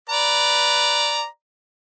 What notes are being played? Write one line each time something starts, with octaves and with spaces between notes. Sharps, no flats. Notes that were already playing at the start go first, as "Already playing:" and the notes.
B4 D5 A#5